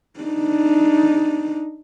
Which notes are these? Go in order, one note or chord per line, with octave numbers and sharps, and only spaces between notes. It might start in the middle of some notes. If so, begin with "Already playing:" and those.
D4 D#4